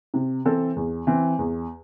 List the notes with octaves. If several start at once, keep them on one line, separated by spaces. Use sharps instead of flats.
C3
E3 C4 A4
E2
E3 C4
E2